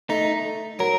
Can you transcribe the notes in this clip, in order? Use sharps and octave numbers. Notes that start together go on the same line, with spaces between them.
A3 D#4
F#3 A#4